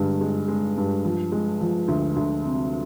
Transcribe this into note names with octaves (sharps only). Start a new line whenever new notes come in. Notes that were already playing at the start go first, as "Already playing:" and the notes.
Already playing: G2 D3 G#3
G#3
G#3
G2
F3
G#3
F3
D2
D2
C3